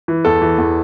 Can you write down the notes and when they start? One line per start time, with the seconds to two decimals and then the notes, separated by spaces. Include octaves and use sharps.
0.08 E3
0.25 E2 A4
0.42 E3
0.58 E2